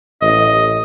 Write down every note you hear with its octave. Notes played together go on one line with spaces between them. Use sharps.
A1 D#5